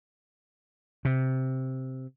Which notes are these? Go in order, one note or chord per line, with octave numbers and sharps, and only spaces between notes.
C3